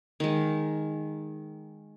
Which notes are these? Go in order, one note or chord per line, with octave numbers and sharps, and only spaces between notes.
D#3 G#3